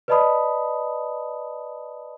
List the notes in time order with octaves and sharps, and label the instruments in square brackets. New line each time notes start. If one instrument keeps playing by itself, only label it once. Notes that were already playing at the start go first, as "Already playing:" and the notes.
[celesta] B4 D5 D#5 A5 B5 D#6